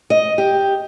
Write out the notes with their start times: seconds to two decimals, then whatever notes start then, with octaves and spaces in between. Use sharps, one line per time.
0.10 D#5
0.38 G4